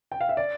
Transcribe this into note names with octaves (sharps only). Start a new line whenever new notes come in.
G5
F5
E5
D5